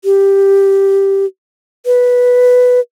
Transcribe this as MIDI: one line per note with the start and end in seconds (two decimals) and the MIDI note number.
0.05 1.25 67
1.86 2.80 71